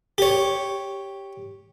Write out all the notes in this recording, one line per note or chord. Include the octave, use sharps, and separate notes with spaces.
G4 C#5